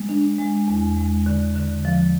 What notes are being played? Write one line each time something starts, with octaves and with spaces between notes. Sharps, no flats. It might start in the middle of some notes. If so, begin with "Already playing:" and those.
Already playing: G#3
D4
G#3
E2
G#3
D3
D3
F3